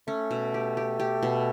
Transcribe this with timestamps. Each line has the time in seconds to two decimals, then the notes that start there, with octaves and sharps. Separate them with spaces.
0.08 A3 C#4
0.31 B2
0.54 G4
0.77 G4
1.00 G4
1.23 B2